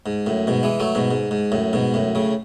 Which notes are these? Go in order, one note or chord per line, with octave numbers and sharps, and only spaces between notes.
G#2
F#2 A2
G#2 B2
E3 G#3
F#3 A3
G#2 B2
G#2
G#2
F#2 A2
G#2 B2
F#2 A2
A2 C#3